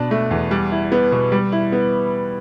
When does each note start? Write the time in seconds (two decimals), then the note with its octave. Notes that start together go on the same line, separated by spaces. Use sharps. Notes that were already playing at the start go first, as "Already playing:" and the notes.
Already playing: B2 D4
0.11 A3
0.30 E2
0.51 G3
0.71 E4
0.92 B3
1.12 B2
1.32 G3
1.52 E4
1.72 B3